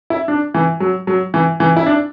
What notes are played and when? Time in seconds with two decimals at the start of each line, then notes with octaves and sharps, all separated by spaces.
0.10 E4
0.28 D4
0.54 E3
0.80 F#3
1.07 F#3
1.34 E3
1.60 E3
1.77 E4
1.86 D4